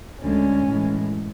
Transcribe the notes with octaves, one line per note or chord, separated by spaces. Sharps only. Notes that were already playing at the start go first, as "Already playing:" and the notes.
D2 D3 G#3 C#4
A2 E3 G#3